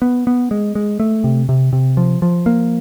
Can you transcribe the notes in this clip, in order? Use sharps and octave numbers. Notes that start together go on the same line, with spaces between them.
B3
B3
G#3
G#3
A3
C3
C3
C3
F3
F3
A#3